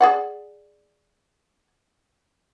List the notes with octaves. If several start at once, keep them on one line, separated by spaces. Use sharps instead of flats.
G#4 D5 F#5